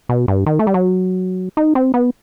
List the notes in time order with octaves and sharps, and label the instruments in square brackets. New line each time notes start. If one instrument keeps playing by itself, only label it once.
[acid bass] B2
G2
D#3
A3
G3
F#3
D#4
C4
B3